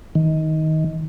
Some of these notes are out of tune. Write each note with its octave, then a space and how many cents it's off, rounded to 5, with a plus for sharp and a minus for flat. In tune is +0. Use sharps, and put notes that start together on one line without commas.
D#3 +20